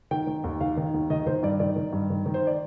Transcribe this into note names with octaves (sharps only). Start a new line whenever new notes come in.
D#3 G5
D#3
D#2
D#3 F5
D#3
D#2
D#3 D#5
D#3 C5
G2 D5
D#3 D5
D#3
G2
D#3
D#3
C5
D5